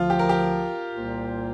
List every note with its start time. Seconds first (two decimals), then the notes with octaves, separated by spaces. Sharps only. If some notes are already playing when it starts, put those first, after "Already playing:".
Already playing: D2 D3 F3 F4
0.10 G4
0.19 A#4
0.29 G4
0.92 C2 A#2 A#3 F4 C5